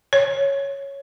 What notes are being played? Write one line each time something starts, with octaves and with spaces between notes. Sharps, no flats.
C#5